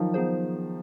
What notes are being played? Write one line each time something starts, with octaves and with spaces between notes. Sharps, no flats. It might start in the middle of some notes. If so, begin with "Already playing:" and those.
Already playing: D#3 F3 F#3
B3 D#4 G#4 C5